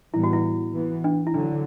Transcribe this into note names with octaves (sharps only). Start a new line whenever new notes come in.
A2 E3 G3 B3 E4
F#4
E4
E3 B3
D4
E4
D3 F#3 D4